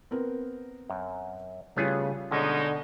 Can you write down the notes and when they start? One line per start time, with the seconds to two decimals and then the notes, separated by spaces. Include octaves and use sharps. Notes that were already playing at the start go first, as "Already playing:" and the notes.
0.11 B3 C4 A#4
0.90 F#2
1.76 C#3 G3 A3 B3 F4 G#4
2.31 B2 D3 G#3 C#4 D#4